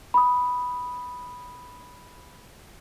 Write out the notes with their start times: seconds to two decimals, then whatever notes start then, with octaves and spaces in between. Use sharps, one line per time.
0.14 B5 D#6